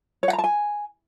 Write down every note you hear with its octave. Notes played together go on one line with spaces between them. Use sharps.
C#5
F#5
A#5
A5
G#5